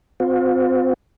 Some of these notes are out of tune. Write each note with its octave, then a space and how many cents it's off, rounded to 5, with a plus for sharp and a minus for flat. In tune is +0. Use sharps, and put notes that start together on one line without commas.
C4 -20 F4 +45